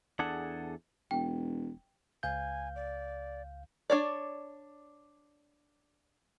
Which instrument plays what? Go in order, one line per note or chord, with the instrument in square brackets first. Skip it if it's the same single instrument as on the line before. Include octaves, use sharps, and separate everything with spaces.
[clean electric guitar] E2 D4 G#4 A4 F#5
[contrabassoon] E1 [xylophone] G5
[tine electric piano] C#2 F5 G6 [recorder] G#5
[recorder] D5
[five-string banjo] D4 C#5 D5